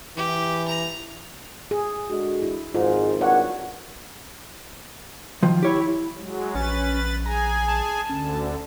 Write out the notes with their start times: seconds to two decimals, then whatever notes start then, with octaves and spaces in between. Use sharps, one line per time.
0.17 E3 G4
0.68 A#5
1.71 G#4
2.08 D3 G#3 F#4
2.42 E4
2.74 G#1 G#2 F4
3.21 G2 A#3 C#5 F#5
5.43 D#3 F3
5.63 E4 G4 C#5
6.18 F#3 G#3
6.55 A#1 C#4 B4 A6
7.26 G#4 G#5 A#5
7.68 A5
8.10 D2 D3 C#4